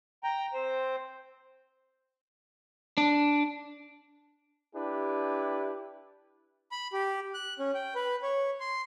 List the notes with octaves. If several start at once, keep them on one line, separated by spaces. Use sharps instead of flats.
G5 A#5
C4 C5
D4
D4 E4 G4 B4
B5
G4
F#6
C#4
G5
B4
C#5
C6